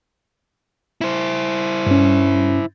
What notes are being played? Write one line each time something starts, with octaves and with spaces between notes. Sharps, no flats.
E4 C5
G2 C#4